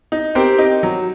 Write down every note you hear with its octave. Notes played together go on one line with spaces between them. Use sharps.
D#4
C4 G4 A#4
D#4
F#3